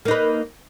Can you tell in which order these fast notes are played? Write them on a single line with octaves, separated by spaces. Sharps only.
A#3 D#4 B4